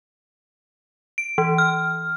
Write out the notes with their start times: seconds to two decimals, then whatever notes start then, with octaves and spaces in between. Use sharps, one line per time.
1.18 D7
1.38 E3
1.58 F6